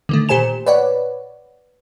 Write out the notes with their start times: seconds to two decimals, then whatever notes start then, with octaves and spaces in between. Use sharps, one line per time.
0.09 D3 D#3 A3
0.29 A#2 G4 C5 G#5 E7
0.66 B4 C#5 D5 F#5